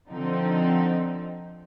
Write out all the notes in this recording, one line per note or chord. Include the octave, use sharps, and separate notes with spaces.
D3 F3 C4 D#4